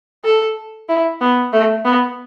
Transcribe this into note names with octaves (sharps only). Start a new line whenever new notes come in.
A4
E4
B3
A3
B3